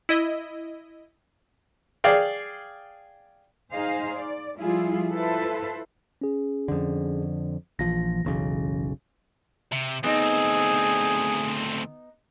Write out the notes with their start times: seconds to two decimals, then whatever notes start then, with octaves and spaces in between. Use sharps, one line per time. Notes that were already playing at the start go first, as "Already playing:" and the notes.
0.09 E4 D#5
2.04 G#4 D5 F5 G5
3.72 D#4 G#4 C5 D#5 F5
4.17 D5
4.59 F3 G3 E4 F4 G#4
5.10 E4 F4 A4 B4 C5 E5
6.21 C#4 G#4
6.68 F2 D3
7.79 A#1 E3 F3 A#6
8.25 F#1 B1 C#3
9.72 C3
10.04 D2 B3 C4 D#4 G#4